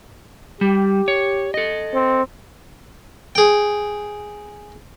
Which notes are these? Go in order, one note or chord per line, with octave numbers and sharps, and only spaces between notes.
G3 G4
C#5
A4 D#5
C4
G#4 G5